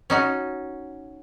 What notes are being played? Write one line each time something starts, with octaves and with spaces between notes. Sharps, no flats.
C#4 D#4 F#4